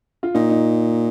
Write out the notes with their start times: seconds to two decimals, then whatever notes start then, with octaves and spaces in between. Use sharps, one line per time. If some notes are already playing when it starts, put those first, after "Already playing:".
0.23 F4
0.34 A#2 D#4
0.50 D#4